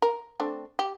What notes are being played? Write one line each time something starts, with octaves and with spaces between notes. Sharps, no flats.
A#4
A3 C4 D4
G4